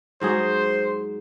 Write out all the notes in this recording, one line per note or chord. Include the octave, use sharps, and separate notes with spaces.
G#2 F#3 G#4 C5